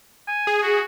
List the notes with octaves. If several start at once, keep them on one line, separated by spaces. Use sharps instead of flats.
G#5
G#4
F#4